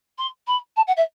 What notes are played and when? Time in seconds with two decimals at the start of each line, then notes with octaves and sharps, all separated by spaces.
0.18 C6
0.47 B5
0.76 A5
0.87 F#5
0.96 E5